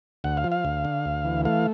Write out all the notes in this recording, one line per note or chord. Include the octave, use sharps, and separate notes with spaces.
D2 F#5
F5
F3
F5
D2
D3
D2
E3
A3 F5